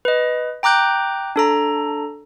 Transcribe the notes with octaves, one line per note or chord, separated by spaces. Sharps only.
B4 D#5
G5 A#5 D6 F#6 G6
D4 A4 A#5